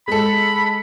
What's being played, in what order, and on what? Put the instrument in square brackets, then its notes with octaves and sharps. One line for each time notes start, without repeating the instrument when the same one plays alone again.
[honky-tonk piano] G#3 A4 [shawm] B5